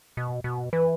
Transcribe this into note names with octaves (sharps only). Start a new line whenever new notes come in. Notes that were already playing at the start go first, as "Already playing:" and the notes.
B2
B2
E3 B4